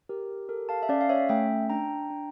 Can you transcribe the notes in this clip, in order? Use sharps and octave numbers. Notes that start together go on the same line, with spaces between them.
G4 A#4
A4 A#4
F5 A5
E5
C#4 D5 F5
F5
C#5 E5
A3 E5 G5
D4 G5 A#5
D4